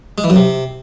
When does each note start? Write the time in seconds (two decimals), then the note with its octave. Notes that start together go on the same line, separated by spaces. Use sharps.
0.18 G#3
0.24 E3
0.30 F#2
0.36 C3